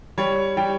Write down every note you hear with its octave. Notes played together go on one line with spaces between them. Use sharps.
G3 C#5
G3 G5